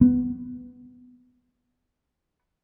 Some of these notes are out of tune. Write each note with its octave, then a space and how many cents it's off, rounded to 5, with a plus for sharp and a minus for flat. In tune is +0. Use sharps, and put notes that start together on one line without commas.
B3 +10